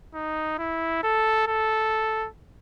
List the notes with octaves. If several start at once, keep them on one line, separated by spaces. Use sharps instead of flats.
D#4
E4
A4
A4